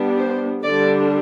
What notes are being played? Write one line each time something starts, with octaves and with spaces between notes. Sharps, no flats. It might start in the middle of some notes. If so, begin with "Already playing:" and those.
Already playing: G3 B3 D4
C5
D3 G3 D4 D5